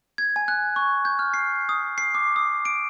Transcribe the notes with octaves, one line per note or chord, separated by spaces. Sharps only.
G#6
G#5
F#6
C#6
G6
F6
C7
D#6
C7
D6
D#6
D7